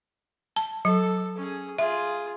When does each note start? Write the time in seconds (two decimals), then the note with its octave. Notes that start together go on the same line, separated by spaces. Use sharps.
0.56 A5
0.85 F#3 A4
1.38 C#4 G#4
1.79 F4 G#4 E5